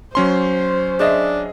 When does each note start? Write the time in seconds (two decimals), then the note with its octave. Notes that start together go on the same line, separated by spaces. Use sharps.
0.15 F#3 C#4 C5 C6
0.99 D4 G#4 D#5 E5